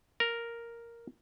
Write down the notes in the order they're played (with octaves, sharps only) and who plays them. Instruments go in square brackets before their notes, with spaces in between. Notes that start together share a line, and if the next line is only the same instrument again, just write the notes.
[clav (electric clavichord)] A#4